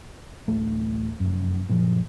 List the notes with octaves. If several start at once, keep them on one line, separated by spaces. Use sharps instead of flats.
D1 A1 A3
F1 F#2
F#1 A#2 F3